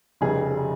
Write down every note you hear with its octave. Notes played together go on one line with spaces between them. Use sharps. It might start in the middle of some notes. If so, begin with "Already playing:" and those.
F1 F2 C#3 G3 G#4